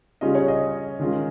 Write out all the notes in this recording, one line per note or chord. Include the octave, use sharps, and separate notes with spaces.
C#3 G3 C#4 F4 D#5
C#5
D#5
D#3 G#3 C#4 F4